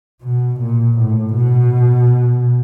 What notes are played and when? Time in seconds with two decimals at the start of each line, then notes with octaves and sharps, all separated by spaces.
0.22 B2
0.60 A#2
0.97 A2
1.34 B2